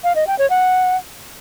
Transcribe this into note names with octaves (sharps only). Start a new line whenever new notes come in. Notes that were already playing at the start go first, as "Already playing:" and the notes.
F5
D#5
G5
C#5
F#5